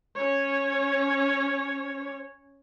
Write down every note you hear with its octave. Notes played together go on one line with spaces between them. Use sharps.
C#4 C#5